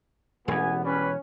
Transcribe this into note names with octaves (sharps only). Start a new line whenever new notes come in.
E1 A1 E2 B3 G#5
G3 C#4 B4